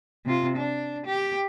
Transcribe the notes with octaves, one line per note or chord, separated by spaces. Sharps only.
C3 F4
D4
G4